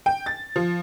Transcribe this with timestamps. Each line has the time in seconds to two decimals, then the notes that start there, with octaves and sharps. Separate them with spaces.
0.06 G5
0.26 A6
0.56 F3